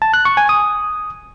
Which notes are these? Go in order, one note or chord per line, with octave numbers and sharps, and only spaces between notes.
A5
F#6
C#6
G#5
D#6